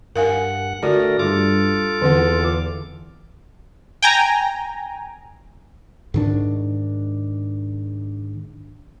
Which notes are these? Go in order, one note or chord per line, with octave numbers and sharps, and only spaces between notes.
G2 A#4 F5 F#5 G#5
D3 A3 F#4 A#4 D5
G2 F4 A4 D6
E2 D3 C4 F#5
G5 G#5 A#5
G#2 D#3 D4